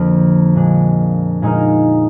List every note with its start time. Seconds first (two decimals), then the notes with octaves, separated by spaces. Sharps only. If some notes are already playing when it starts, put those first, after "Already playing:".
Already playing: F2 D3 F3 A#3 D4
0.55 A#2 G#3 D4
1.42 A#2 G#3 D#4 A#4